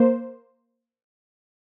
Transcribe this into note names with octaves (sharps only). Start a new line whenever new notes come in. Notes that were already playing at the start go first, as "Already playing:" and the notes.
Already playing: A#3 C5